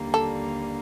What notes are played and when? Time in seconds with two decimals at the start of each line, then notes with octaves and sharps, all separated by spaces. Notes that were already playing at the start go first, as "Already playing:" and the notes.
Already playing: D#2 D3 G3 A#3
0.14 A4